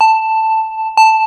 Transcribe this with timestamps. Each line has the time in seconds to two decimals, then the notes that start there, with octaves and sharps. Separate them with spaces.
0.01 A5
0.97 A5